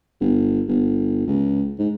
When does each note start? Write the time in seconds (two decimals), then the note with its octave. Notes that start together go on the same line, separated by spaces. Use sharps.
0.20 G1
0.68 G1
1.27 C#2
1.79 G#2